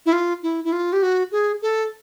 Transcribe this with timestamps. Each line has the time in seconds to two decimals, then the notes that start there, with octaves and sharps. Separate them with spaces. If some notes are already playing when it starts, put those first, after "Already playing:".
0.06 E4
0.13 F4
0.43 E4
0.65 E4
0.73 F4
0.93 G4
1.02 F#4
1.32 G#4
1.62 A4